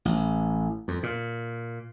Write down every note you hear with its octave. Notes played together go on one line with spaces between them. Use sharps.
A1
F2
A#2